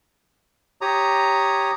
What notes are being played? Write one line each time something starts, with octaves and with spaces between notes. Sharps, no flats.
G4 C#5 A#5 D#6